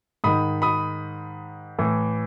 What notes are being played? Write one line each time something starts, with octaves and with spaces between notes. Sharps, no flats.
G#2 D#3 B5 D#6
B5 D#6
A2 E3